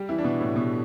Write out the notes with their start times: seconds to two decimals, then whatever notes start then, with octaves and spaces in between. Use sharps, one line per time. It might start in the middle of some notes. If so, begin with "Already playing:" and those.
Already playing: G3 G4
0.09 E3 E4
0.19 D4
0.24 B2 B3
0.40 A2 A3
0.56 B2 B3